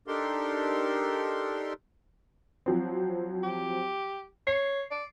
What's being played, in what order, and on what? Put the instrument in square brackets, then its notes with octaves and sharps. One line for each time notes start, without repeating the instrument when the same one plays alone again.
[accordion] D4 D#4 G4 A4 A#4 C6
[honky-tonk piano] F3 F#3 C4
[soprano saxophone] G4
[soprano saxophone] C#5 [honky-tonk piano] C7
[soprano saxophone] D5